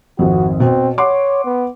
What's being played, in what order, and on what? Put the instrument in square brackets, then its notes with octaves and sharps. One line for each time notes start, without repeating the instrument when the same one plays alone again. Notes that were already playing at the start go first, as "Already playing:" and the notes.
[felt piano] G#1 F2 [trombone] F#4
[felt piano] B2 [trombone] C4
[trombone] C#5 [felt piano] F#5 C6 D6
[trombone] B3